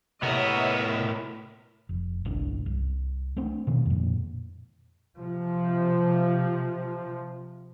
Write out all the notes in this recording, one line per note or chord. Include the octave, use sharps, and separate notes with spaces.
A2 C3 B3 A#4 C#5 D#5 E5
F1
G1 C2 D4
C2
A3 C4 D4
B2 D#3
F2 A#2
C3 F3